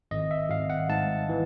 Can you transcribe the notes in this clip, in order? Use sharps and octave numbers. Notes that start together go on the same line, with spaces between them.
G#1 D#5
E5
G#1 F5
F#5
G#2 A5
E3